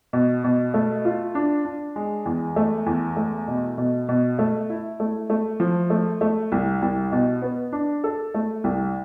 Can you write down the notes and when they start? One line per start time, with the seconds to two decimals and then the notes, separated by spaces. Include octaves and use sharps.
0.13 B2
0.44 B2
0.74 A3
1.05 F4
1.35 D4
1.65 D4
1.96 G#3
2.26 E2
2.56 A3
2.86 E2
3.17 A3
3.48 B2
3.78 B2
4.09 B2
4.39 A3
4.70 E4
5.00 A3
5.30 A3
5.60 F3
5.90 A3
6.21 A3
6.52 C2
6.82 C2
7.12 B2
7.42 B3
7.72 D4
8.04 A4
8.34 A3
8.64 C2